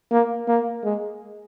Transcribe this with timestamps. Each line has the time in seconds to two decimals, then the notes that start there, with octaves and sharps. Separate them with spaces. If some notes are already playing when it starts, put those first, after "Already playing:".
0.11 A#3
0.48 A#3
0.84 G#3